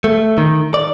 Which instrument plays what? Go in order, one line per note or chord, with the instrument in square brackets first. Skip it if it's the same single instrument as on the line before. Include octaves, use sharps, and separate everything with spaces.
[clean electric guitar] A3
D#3
D5